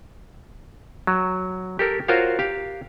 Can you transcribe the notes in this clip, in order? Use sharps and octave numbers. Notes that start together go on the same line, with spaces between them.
F#3
G4 A4 A#4
F4 F#4 A#4 C5 C#5 F5
G4 F5